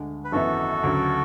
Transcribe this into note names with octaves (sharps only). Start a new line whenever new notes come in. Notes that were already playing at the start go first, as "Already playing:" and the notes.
Already playing: D2 D3 G#3 D4
B4
G#1 F#2 E3 B3 E4 F#4 A4
D2 C#3 F#3